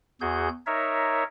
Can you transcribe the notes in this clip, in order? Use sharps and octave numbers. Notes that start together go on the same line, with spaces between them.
E2 F#4 G#4 G6
D#4 A#4 C#5 E5